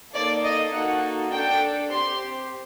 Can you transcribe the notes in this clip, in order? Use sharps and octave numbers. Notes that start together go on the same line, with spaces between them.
A#3 D#4 A4 D5
D#5
A#3 D#4 F#4 A4 F#5
D4 A4 G5
C4 G4 C6